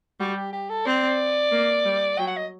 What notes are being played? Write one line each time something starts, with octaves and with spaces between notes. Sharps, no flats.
G3 F#4
G4
G4
A4
C4 D5
A#3
G3
F#3 G5
F#5
D#5